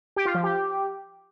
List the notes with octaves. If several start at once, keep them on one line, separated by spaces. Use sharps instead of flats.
G4
F4
F3
G4